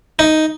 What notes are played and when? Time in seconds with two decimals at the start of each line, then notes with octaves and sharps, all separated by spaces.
0.19 D#4